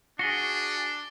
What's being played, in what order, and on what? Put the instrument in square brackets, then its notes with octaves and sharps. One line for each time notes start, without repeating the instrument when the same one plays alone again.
[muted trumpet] D4 [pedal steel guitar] F#4 G#4 [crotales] A#6 G7